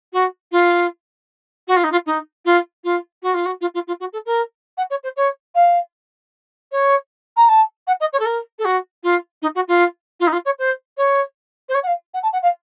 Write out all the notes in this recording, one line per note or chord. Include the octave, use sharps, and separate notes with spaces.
F#4
F4
F#4
F4
D#4
F4
D#4
F4
F4
F#4
F4
F#4
F4
F4
F4
F#4
A4
A#4
F#5
C#5
C5
C#5
F5
C#5
A#5
A5
F#5
D#5
C#5
A4
A#4
A4
F#4
F4
D#4
F#4
F4
F4
D#4
F4
C#5
C5
C#5
C5
C#5
F#5
F5
F#5
A5
F#5
F5